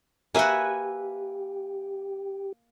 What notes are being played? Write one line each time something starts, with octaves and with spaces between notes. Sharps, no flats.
A#3 F#4 G4 B4 E5 G#5